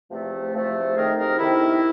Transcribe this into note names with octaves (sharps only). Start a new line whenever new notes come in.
E2 C3 F3 A3
E2 C3 F3 A3
F2 C3 D#3 G#4 A#4
G#4 A#4
F2 C3 D#3 E4